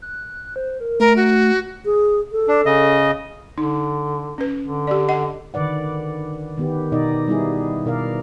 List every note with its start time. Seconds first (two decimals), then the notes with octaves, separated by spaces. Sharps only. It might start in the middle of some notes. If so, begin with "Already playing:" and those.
0.02 F#6
0.56 C5
0.80 A#4
1.00 A3 A#4
1.16 F#4
1.85 G#4
2.32 A4
2.48 D4
2.66 C#3 D#5
3.58 D3 D#4
4.38 C#4 B4
4.64 D3
4.87 G4 D5
5.09 D#5 F#5
5.54 D3 D#3 B4 D5 F#5
6.57 D#3 B3 G4
6.92 B2 D#4 D5 D#5
7.28 G3 B3 D#4 E4 G#4
7.86 B2 A#4 D5 F5